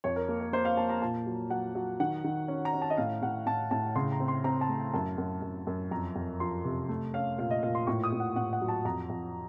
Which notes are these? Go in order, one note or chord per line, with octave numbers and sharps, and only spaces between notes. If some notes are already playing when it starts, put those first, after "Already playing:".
F2 C#5
A#4
A#3
A#4
A#3 C5
F5
A#3 A5
A#5
A#2 A5
F#3
F#3 F#5
F#3
D#3 F#5
D#3
C#4
A#5
C#4
A5
D#5
A2 F5
A2 F#5
A2 A5
A2 A5
C#3 C6
A#5
C4
C6
C4 A#5
A5
A3
F#2 A5
F#2
F#2
F#2
F2 A#5
F2
F3 C6
C3
A3
C#4 F5
A#2 F5
D#5
A#2 F5
C6
A2 C#6
D#6
A2
F#5
A2 F#5
F#5
F#3
A5
F2 A#5
F2